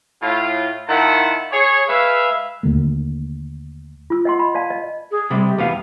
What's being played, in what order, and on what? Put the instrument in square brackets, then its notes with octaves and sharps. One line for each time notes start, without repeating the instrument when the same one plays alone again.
[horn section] A2 F4
D#3 E4 F4 F#5 A5
G#4 C#5
G#3 B4 E5 F5
[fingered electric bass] D#2 D3 A3 A#3
[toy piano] F4 E6
D#5 F#5 C6
B5
D5 F5 A5
D#5
[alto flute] G#4
[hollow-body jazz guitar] C3 G3 G#3
[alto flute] G4
[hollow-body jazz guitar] E2 B3 F5